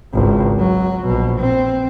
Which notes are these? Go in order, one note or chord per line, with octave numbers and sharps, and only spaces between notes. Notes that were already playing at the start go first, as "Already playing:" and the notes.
G#1 C#2
F#3
A#1 B2
C4